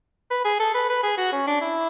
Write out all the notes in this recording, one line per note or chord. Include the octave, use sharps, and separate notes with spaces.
B4
G#4
A4
B4
B4
G#4
F#4
C#4
D4
E4